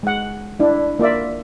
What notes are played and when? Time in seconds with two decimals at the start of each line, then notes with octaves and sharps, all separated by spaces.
0.03 G#3 F#5
0.60 D4 E4
0.99 A#3 F4 D5 E5